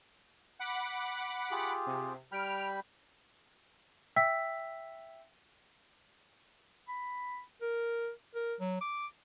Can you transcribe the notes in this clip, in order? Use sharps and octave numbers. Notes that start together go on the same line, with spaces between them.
F#5 B5 D6
F4 G4 G#4
C3
G3 G5 B5 F6 D7
E5 G5 E6 B6
B5
A#4
A#4
F#3
D6